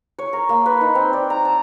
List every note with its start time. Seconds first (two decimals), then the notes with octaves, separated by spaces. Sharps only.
0.19 C#5
0.33 A#4
0.49 A#3
0.66 B4
0.81 D#4
0.95 C4
1.13 D5
1.30 A#5
1.45 A5